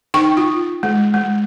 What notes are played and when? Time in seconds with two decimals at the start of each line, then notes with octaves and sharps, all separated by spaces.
0.14 D#4 G5 C#6
0.37 F4
0.83 G#3
1.14 G#3